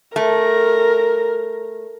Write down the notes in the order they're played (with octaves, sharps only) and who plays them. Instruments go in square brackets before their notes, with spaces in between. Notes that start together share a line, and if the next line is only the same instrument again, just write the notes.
[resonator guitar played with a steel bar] A3 [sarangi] A#4